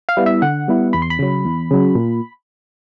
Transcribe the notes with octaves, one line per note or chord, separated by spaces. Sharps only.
F5
G3 B3 E4
E5
D3 F#5
G3 B3 E4
E2 B5
C6
B5
C#3 F#3
E2
C#3 F#3
A#2